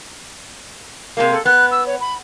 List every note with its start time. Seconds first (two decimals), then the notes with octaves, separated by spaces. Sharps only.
1.17 C3 G#3 A#3
1.32 A4
1.45 B3 F#6
1.71 E6
1.87 C#5
2.01 B5